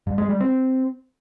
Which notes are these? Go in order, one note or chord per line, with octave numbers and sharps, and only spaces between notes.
G2
G#3
G3
C4